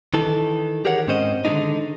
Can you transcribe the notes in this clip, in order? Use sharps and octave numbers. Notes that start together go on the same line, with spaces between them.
D#3 E3 A4
G4 G#4 A#4 C#5 F#5
G#2 C4 C#4 C5 D#5
D3 D#3 F#3 G#3 D4 D#4